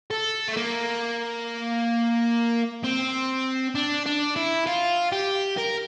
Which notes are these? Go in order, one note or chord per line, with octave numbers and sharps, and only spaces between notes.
A4
A3
A#3
C4
D4
D4
E4
F4
G4
A#4